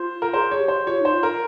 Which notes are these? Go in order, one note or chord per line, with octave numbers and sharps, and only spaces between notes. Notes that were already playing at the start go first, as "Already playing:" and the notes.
Already playing: F4 C5
A#4
G#4 C5
C#5
G4
C5
F4 C#5
D#4 C5
F4
A#4